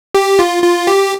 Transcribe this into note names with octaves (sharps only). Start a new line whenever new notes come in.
G4
F4
F4
G4